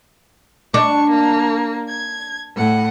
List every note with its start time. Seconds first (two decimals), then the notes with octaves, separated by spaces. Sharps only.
0.74 D4 C#6
1.10 A#3
1.89 G#6
2.56 A2 F#5